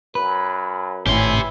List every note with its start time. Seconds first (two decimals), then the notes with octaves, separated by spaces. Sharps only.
0.15 F#2 B4
1.07 G#1 A2 E3 C#4 G4 C6